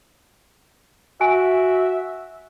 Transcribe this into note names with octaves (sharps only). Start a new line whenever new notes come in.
F#4 E5 G#5